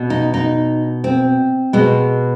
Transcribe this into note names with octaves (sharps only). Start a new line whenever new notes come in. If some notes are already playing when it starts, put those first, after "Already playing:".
Already playing: B2
D#4
D#4
C4
B2 G#3